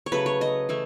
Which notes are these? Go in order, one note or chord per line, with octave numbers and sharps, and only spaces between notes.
C#5
C#3 F#3 A3 B4
C#5
D#5
E3 A3 E4